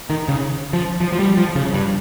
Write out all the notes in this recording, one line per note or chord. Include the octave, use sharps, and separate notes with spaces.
D#3
C#3
F3
F3
F3
G3
F3
C#3
G2